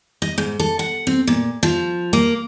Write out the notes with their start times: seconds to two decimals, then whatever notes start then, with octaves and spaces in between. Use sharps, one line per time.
0.22 D#5
0.38 G#2
0.60 A4
0.79 F#5
1.07 C4
1.27 A#2
1.63 F3
2.13 A#3